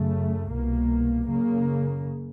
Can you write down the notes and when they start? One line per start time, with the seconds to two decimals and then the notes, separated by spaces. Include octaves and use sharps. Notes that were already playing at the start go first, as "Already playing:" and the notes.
Already playing: F#2 C#3 A3
0.49 C2 B2 A#3
1.27 F#2 C#3 A#3